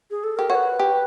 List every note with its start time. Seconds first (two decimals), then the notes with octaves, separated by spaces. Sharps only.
0.11 G#4
0.24 A4
0.37 G4 A#4
0.50 F#4 C#5
0.55 B4
0.79 G4